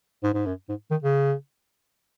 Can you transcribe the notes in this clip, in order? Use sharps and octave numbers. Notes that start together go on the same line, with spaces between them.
G#2
G#2
F#2
G#2
D#3
C#3